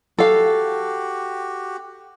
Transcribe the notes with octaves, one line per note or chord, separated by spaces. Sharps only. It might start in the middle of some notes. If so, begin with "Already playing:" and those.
F#4 G4 A4 F5